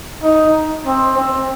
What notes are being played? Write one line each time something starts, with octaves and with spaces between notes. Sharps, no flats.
D#4
C4
C4